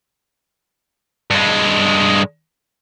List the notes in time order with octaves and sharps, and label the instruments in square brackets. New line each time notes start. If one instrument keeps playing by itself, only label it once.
[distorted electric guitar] G2 G#3